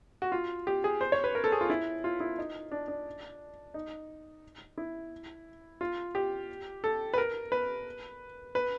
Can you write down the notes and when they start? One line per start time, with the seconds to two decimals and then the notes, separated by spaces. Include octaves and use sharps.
0.22 F#4
0.32 F4
0.67 G4
0.84 G#4
1.01 C5
1.12 C#5
1.24 B4
1.35 A#4
1.44 A4
1.52 G#4
1.61 F4
1.70 E4
2.04 F4
2.20 E4
2.38 D#4
2.71 D4
2.88 D4
3.74 D#4
4.78 E4
5.81 F4
6.15 G4
6.84 A4
7.14 B4
7.18 A#4
7.52 B4
8.55 B4